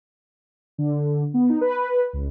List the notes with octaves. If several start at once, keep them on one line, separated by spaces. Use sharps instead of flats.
D3
B3
D#4
B4
C#2